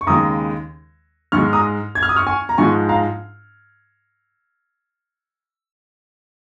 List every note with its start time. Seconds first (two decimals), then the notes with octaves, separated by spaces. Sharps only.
0.01 C#6
0.07 D#2 C#3 G#3 A#5 D#6
1.32 G#2 C#6 F6
1.36 G#3
1.53 A#5 D#6
1.95 G#6
2.03 F6
2.09 D#6
2.16 C#6 F6
2.27 G#5 C#6
2.49 A#5
2.58 G#2 F3 G#3 G#5 C#6
2.89 F5 A#5